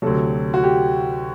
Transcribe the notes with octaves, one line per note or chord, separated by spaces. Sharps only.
D2 C3 F#3 A4
F#4
G4